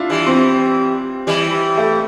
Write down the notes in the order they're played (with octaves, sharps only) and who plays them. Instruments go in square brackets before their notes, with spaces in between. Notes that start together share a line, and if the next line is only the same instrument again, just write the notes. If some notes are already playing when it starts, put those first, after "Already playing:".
Already playing: [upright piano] D4 E4 F4
[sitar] E3 G3
[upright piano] C4
[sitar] E3 G3
[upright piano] A3